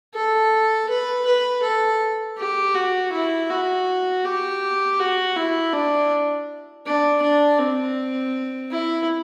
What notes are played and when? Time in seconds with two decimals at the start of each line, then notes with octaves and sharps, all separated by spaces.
0.14 A4
0.89 B4
1.25 B4
1.63 A4
2.38 G4
2.75 F#4
3.12 E4
3.49 F#4
4.25 G4
4.99 F#4
5.36 E4
5.73 D4
6.86 D4
7.22 D4
7.59 C4
8.71 E4